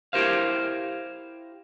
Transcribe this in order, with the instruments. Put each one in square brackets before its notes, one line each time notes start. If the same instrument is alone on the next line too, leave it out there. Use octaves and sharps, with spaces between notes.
[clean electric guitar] E4 G4 A#4 C5 F5